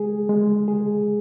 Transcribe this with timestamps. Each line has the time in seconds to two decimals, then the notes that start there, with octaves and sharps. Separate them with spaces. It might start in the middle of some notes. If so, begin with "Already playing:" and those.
Already playing: G#3 G#4
0.29 G#3
0.68 G#4